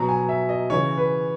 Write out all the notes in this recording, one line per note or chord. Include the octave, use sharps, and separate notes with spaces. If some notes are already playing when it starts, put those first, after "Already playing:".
Already playing: B2 F#3 A#5
G#5
E5
D#5
C#3 E3 C#5
B4